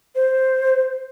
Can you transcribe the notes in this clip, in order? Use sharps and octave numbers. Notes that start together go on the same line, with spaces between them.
C5